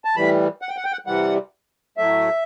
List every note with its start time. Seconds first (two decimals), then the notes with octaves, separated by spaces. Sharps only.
0.05 A5
0.16 A2 E3 G3 B5
0.62 F#5
0.69 G5
0.77 F#5
0.84 G5
0.92 F#5
1.07 C3 E3 G3 F#5
1.97 A2 F#3 A3 E5